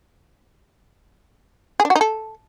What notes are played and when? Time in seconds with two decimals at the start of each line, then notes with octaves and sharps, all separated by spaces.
1.80 G#4
1.85 D4
1.90 F#4
1.96 D#4
2.01 A4